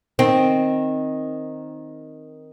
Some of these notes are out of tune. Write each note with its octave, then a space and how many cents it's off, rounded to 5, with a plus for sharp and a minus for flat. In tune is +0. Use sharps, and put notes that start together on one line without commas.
D#3 +0 C4 +0